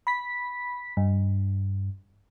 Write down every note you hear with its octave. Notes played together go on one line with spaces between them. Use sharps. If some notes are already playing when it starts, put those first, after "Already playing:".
B5 B6
G2